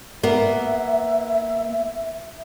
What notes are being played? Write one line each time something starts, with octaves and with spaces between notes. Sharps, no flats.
A#3 B3 E5